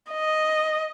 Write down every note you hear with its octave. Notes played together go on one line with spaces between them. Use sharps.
D#5